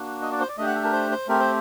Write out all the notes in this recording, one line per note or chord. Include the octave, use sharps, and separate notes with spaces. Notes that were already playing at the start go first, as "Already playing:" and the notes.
Already playing: A#3 D4 F#4
D#5
D5
C5
D5
A3 D4 G4 D#5
F#5
A4
A#4
C5
C5
A3 C4 G4 A#4
C5